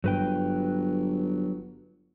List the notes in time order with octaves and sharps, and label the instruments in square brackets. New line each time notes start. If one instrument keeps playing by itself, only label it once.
[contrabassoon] G1 [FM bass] G2 [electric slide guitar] F#3 B4 G5